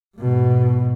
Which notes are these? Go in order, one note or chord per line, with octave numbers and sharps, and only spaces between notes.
G#2 B2